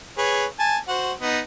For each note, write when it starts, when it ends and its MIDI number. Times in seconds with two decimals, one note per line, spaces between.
0.18 0.46 68
0.18 0.46 71
0.18 0.46 73
0.59 0.77 80
0.59 0.77 81
0.88 1.13 66
0.88 1.13 72
0.88 1.13 78
1.21 1.40 59
1.21 1.40 63